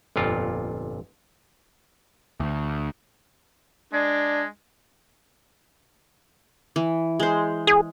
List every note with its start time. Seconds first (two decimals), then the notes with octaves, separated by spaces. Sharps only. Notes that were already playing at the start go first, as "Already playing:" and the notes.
0.16 G1 F2 A#2 F4
2.40 D2
3.93 G#3 D4
6.76 E3
7.20 G#3 C5
7.67 G#4